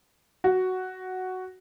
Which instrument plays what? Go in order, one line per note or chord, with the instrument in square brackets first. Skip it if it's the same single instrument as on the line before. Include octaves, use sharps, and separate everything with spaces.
[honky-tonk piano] F#4